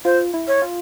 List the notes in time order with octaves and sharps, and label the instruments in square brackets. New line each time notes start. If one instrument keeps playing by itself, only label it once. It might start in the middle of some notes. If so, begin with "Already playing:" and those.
[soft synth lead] F4 [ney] C5
[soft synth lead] E4
[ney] C#5
[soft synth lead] F4